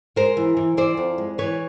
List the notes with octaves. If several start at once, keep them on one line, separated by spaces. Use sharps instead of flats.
G#3 A#4 C5
E3
E3
E3 C5 D5
F2
G#3
E3 B4 C#5